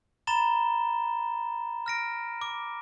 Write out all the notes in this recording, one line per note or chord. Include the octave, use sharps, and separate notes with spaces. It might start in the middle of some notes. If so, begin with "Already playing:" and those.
A#5 B5 A6 E7 G7
F6 A#6 D7
D6